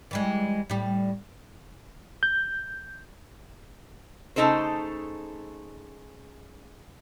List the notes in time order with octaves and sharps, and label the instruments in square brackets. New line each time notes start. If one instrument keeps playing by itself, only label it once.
[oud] E3 G3 G#3
A2 G3
[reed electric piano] G6
[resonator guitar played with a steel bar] C#3 A3 D#4 A4 C5